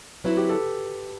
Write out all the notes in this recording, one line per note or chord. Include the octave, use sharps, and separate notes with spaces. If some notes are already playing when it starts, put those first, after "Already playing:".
F#3 C4 E4 B4
G4
A4